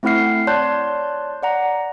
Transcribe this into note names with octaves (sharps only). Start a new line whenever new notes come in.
A3 C4 E4 F#5 F6 C7
C#5 D5 A5 C6 F#6 G6
D5 F#5 A#5